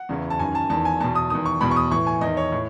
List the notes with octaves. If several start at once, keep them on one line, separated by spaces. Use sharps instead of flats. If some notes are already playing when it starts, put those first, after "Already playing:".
Already playing: F#5
E2 C#3 E3
A5
F#2 D#3 G#5
A5
E2 D#3 A5
G#5
E2 B2 A5
D#6
E2 D#3 D#6
C#6
E2 B2 B5
C#6
D#6
A2 E3 C#6
G#5
E2 D#3 D#5
C#5
A2